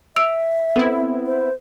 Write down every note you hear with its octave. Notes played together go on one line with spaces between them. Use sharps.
E5 E6 D7 F7
B3 C4 E4 A4
C5